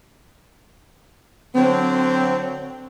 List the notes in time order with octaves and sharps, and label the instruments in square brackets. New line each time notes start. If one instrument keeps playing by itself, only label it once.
[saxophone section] D3 F#3 C4